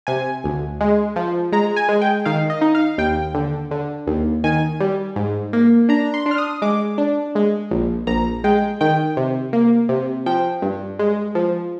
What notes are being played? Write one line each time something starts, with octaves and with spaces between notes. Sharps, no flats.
C3 G#5
D2
G#3
F3
G#3 A#5
G#5
G#3
G5
D#3 F5
D#5
D#4
F5
D#2 G5
D3
D3
D#2
D#3 G#5
G3
G#2
A#3
D4 A#5
C6
D4
F6
D#6
G#3 D6
D4
G#3
A#1
A#1 A#5
G#3 G5
D#3 G5
C3
A#3
C3
F3 G5
G2
G#3
F3